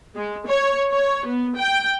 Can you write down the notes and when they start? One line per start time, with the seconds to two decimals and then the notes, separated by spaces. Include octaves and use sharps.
0.15 G#3
0.47 C#5
0.90 C#5
1.26 B3
1.57 G5